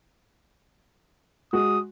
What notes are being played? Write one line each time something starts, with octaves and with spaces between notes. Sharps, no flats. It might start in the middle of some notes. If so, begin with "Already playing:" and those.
G#3 F#4 D#6